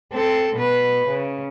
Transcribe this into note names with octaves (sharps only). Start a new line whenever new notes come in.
C4 A4
B2 B4
C#3